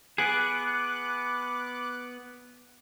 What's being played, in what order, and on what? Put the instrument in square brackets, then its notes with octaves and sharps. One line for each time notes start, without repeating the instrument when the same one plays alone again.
[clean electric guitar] B3 G#4 [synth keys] D6 F#6